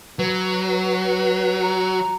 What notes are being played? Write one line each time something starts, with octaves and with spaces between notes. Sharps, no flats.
F#3 B4
A#5